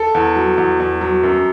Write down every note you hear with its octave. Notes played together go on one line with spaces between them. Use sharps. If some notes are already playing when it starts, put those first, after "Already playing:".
Already playing: A4
E2
F#3
E2
E2
F#3
F#2